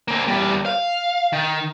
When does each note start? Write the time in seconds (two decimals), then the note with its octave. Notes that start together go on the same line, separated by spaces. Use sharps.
0.08 A#3 C4
0.28 E2 G3
0.66 F5
1.33 D#3